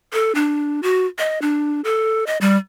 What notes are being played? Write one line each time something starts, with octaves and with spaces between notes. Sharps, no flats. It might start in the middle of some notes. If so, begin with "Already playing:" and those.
A4
D4
F#4
D#5
D4
A4
D#5
G3